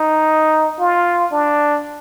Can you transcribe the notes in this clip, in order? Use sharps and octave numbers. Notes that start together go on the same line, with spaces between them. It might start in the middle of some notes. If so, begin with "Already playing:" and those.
Already playing: D#4
F4
D4